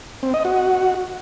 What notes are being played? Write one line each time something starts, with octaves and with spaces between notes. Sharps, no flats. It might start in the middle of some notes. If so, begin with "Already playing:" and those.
C4
D#5
F#4